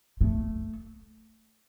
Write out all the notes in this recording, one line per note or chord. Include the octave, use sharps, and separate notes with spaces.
A3